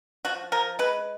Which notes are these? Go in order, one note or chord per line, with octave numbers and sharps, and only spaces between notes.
F3 F#4
F3 A#4
G#3 B4